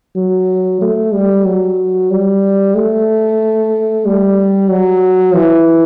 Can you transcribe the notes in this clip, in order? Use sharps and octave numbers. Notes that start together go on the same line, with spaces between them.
F#3
A3
G3
F#3
G3
A3
G3
F#3
E3